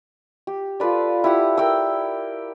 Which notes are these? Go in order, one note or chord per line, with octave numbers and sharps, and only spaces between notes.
G4
F4 A4 B4 D5
E4 G4 F#5
A#4 G5 E6